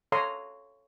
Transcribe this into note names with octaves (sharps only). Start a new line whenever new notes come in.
A4 C#5 F5 A#5 C6 D#6